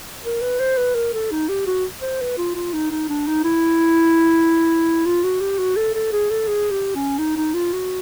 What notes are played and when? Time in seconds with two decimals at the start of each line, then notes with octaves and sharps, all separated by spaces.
0.25 A#4
0.42 B4
0.60 C5
0.77 B4
0.95 A#4
1.13 A4
1.31 D#4
1.49 G4
1.67 F#4
2.02 C5
2.21 B4
2.38 F4
2.55 F4
2.73 D#4
2.91 D#4
3.09 D4
3.27 D#4
3.44 E4
5.06 F4
5.24 F#4
5.41 G4
5.58 F#4
5.77 A4
5.94 A4
6.12 G#4
6.31 A4
6.47 G#4
6.71 G4
6.95 C#4
7.18 D#4
7.37 D#4
7.54 F4
7.73 F#4